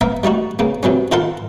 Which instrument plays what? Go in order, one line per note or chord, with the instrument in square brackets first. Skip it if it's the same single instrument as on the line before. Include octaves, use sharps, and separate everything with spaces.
[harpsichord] A#3 B3 A#4 E5
G3 A3 D#4 F#4
C#3 A#3 B3
C3 F#3 B3 C#4
D#3 F4 A4 A#4 F#5 C6